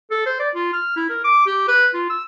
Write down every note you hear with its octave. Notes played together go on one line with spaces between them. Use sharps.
A4
C5
D5
F4
F6
E4
A#4
D6
G4
B4
F4
E6